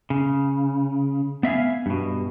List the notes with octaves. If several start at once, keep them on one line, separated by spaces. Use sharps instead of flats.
C#3
B3 E5 F5 G#5
G2 B2